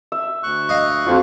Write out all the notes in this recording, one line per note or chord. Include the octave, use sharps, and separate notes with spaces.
E5
D2 C#6 F#6
D#5 F5
F2 F4 F#4